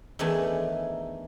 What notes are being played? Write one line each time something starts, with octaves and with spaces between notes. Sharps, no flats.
E2 D#3 E3 A3 D4 G#5